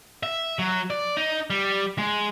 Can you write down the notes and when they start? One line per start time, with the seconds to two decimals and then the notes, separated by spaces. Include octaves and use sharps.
0.23 E5
0.59 F#3
0.90 D5
1.17 D#4
1.50 G3
1.98 G#3